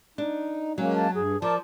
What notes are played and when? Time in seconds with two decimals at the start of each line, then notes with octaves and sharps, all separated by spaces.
0.18 D4 D#4
0.78 F#3 G#3 A#3 C#4
0.94 A5
1.15 G2 G#4
1.42 F3 A#4 D5 A5